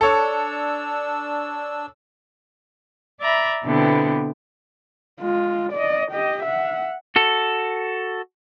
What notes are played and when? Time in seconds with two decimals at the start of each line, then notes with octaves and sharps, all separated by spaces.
0.01 D4 A4 C#5 E6
3.20 D5 E5 A#5 B5
3.64 B2 D3 B3 C4 E4 G4
5.21 G#3 F4
5.73 D5 D#5
6.11 G4 D#5
6.43 E5 F#5
7.16 F#4 A4